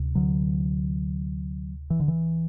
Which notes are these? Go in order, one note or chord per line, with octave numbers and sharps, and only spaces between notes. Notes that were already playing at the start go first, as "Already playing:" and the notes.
Already playing: D2 C3
D3 F#3
E3
D3
E3